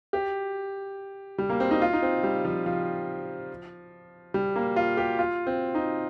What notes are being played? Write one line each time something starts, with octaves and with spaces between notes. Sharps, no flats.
G4
G3
A#3
C4
D#4
F4
D#4
C4
G3
F3
F3
G3
A#3
F4
G4
F4
C4
D#4